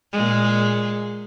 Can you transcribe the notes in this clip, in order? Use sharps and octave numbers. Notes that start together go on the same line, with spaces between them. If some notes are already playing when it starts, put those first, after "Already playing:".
A#2 G#3